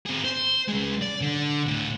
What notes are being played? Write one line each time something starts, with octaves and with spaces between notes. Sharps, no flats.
C4 G#4
C5
C#3 G#3
D5
D3
A2 D3